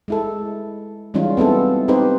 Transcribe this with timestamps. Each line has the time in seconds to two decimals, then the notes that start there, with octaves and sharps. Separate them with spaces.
0.08 G#3 E4 A4
1.14 E3 G3 G#3 C#4 D#4 F4
1.37 B3 C4 E4 A4
1.88 C4 D#4 G4 B4 C5